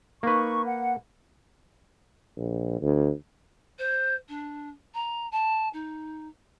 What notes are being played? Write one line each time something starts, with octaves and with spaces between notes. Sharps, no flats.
A#3 D#4 B4 C#6
F#5
A#1
D2
C5
D4
A#5
A5
D#4